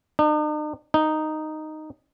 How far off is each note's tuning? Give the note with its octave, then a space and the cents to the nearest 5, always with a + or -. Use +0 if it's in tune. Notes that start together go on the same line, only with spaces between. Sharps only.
D#4 -45
D#4 -5